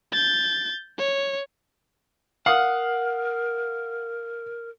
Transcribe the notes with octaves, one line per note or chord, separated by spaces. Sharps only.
G6 A6
C#5
A#4 F5 F#5 D#6